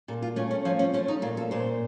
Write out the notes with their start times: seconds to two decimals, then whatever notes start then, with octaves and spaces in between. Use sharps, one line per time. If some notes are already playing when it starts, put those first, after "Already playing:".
0.08 A#2 A4
0.22 F4
0.36 A3 C#4
0.51 C#4
0.65 F3 C#4
0.79 C#4
0.93 A3 C#4
1.08 D#4
1.22 A#2 F4
1.37 A4
1.51 A#2 C5